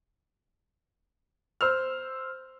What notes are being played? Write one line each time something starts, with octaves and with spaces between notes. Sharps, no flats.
C5 E6 F6